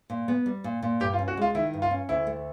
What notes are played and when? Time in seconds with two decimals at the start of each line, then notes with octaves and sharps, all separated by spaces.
0.10 A#2
0.28 B3
0.46 G3
0.64 A#2
0.83 A#2
1.00 G2 G4
1.14 F4
1.19 C#4
1.28 F#4
1.37 G#3 F4
1.55 D#3 E4
1.74 G2
1.82 F4
1.91 C#4
2.09 D2 E4
2.27 A3